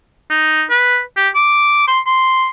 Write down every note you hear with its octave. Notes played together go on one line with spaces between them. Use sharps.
D#4
B4
G4
D6
C6
C6